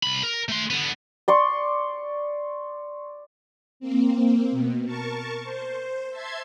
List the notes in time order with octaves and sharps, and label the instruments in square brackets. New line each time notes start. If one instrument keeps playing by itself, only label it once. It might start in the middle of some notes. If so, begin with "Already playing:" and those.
[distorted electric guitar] C2 B5
A#4
A3 C6
D3 B3
[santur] D5 C6 C#6
[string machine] A#3 C4
B2
A#4 A5 C#6
C5
E5 A5 C6 G#6